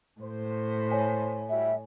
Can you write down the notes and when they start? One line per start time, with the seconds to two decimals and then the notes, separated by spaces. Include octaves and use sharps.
0.21 A2 C5
0.92 C#5 G#5
1.50 G3 E4 F#4 E5